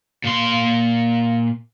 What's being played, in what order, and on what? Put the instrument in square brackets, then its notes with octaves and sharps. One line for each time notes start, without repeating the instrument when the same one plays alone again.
[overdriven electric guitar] A#2 C6